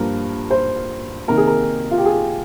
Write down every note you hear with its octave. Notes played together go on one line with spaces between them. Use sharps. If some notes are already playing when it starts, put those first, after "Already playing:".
Already playing: G2 F3 A#3 A#4
C5
C3 D#3 A#3 A#4
G#4
A#4
F4
G4
G#4